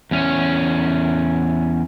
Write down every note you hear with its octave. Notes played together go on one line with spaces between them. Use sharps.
E2 C#4